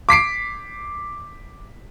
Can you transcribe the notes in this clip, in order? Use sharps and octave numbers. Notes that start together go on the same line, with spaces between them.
D6 B6 C7 D7